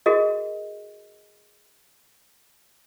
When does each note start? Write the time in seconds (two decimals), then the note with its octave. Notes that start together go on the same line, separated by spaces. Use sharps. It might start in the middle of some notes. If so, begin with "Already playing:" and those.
0.06 F#4 G#4 A#4 D#5